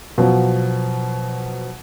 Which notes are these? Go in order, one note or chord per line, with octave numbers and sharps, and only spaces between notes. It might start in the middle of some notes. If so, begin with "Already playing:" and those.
B2 F3 F#3